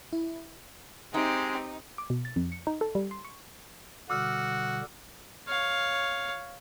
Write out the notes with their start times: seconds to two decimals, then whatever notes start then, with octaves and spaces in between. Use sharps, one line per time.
0.13 E4
1.14 G#3 C4 D#4 G4
1.98 D6
2.10 B2
2.25 A6
2.36 F2
2.52 C#7
2.67 D#4
2.81 A4
2.95 G3
3.11 C6
3.25 C#6
4.10 B2 D3 G3 F#4 D6 E6 F6
5.48 C#5 F5